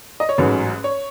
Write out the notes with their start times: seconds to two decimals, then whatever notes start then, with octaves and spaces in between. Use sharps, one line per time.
0.20 D#5
0.29 C#5
0.38 A1 G#2 F#3 C#4 B4
0.84 C#5